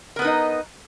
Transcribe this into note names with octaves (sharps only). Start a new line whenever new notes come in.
B3 D#4 A#4 B4 D#5